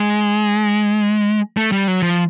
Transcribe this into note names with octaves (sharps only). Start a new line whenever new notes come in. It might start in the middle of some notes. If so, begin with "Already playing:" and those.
Already playing: G#3
A3
G3
F#3
F3